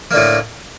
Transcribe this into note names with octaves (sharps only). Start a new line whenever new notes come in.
A2 D3 A#3